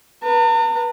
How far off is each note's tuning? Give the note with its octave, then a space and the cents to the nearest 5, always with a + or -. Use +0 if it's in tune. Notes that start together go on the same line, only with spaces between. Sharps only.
B4 -35 A#5 -45